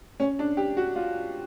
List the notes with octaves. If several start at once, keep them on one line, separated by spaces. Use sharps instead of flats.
C#4
D4
G4
F#4
F4